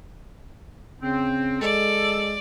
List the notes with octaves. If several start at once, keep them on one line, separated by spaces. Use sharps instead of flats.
C#3 C4
G#3 A4 D5